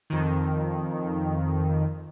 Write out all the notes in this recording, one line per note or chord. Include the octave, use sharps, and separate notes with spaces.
F2 D#3